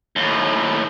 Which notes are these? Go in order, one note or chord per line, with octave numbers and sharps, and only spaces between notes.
D#2 A2